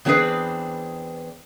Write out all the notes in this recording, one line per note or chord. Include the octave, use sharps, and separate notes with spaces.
E2 F#3 C4 D4 G#4 B4